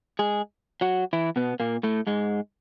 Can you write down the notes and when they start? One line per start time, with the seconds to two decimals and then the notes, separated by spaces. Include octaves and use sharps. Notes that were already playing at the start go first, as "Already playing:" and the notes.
0.19 G#3 G#4
0.81 F#3 F#4
1.13 E3 E4
1.36 B2 B3
1.60 A#2 A#3
1.83 A2 A3
2.07 G#2 G#3